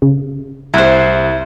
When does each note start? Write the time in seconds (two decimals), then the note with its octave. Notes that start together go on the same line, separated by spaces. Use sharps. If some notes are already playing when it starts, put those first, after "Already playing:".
0.02 C#3
0.74 C2 E4 C5 A#5 F#6